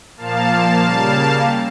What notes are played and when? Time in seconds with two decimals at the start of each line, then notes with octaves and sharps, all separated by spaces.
0.17 A#2 F3 A#3 F5 A5
0.83 C#3 G3 A#3